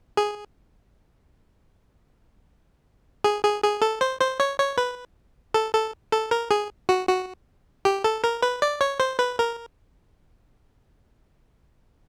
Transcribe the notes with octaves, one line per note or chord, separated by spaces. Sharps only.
G#4
G#4
G#4
G#4
A4
C5
C5
C#5
C#5
B4
A4
A4
A4
A#4
G#4
F#4
F#4
G4
A4
A#4
B4
D5
C#5
C5
B4
A#4